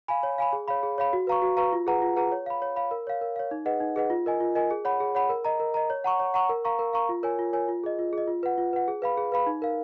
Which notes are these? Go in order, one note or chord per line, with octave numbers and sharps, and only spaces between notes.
F5 G#5 B5
C#5
F5 G#5 B5
G#4
C#5 F5 B5
G#4
C#5 F5 B5
F#4
B4 F5 A#5 C#6
F#4
B4 F5 A#5 C#6
F4
G#4 B4 F#5 A#5
F4
G#4 B4 F#5 A#5
C#5
F5 B5
C#5
F5 B5
A#4
C#5 F5
A#4
C#5 F5
D#4
G#4 B4 D#5 F#5
D#4
G#4 B4 D#5 F#5
F4
A#4 D#5 G#5
F4
A#4 D#5 G#5
G#4
C#5 F#5 B5
G#4
C#5 F#5 B5
A#4
D#5 A#5
A#4
D#5 A#5
C#5
F#5 A#5 C#6
C#5
F#5 A#5 C#6
A#4
F5 A#5 C#6
A#4
F5 A#5 C#6
F4
A#4 C#5 G#5
F4
A#4 C#5 G#5
F4
G#4 D#5
F4
G#4 D#5
F4
B4 F#5
F4
B4 F#5
G#4
B4 F5 B5
G#4
B4 F5 B5
D#4
A#4 F5